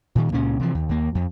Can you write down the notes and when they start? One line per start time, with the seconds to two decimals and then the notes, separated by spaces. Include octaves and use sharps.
0.15 A#2 D#3
0.32 C#2 A#2 C#4
0.60 C3 E3 F3
0.75 D#2
0.89 D#2 A#3
1.15 F2